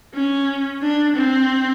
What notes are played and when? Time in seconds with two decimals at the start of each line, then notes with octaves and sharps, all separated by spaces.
0.14 C#4
0.82 D4
1.16 C4